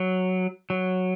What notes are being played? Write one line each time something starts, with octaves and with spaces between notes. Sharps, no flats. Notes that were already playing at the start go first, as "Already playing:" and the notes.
Already playing: F#3
F#3